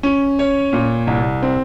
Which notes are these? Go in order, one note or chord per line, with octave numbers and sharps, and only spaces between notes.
C#4
C#5
A#2
C2
C4